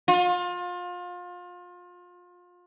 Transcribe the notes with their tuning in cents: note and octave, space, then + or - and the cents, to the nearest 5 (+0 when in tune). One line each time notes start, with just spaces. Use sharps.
F4 +30